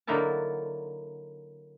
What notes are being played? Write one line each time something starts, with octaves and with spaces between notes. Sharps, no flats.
D3 F#3 A#3 D#4 E4 A5